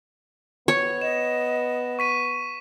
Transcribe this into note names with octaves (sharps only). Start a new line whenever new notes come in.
B3 C#5
D#5 E7
C#6 B6 D#7